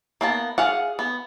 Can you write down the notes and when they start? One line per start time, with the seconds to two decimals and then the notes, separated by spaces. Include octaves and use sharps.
0.21 A#3 B3 A5
0.58 G#4 F5 F#5
0.99 B3